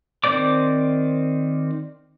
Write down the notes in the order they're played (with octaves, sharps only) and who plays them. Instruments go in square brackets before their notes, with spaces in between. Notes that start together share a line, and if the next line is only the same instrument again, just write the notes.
[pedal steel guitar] D#3 C4 C5 D5 D6